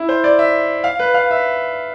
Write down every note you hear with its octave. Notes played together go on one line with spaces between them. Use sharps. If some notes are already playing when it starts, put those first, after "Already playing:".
Already playing: E4
C5
D5
E5
F5
B4
F5
E5